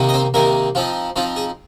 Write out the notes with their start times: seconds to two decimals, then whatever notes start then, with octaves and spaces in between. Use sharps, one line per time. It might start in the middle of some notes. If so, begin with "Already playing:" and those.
Already playing: C3 D#3 A#3 D#4
0.09 D#5
0.14 C4 C5
0.34 C3 D#3 A#3 D#4 A#4
0.75 F3 C4 D#4 F4
1.16 F3 C4 D#4 F4
1.36 G#4